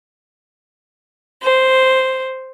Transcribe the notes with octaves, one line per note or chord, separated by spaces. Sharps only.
C5